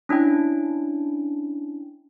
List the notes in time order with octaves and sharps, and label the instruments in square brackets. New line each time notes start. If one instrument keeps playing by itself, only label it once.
[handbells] C#4 D4 E4 G5